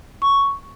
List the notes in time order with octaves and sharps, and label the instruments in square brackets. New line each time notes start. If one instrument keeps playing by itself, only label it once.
[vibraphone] C#6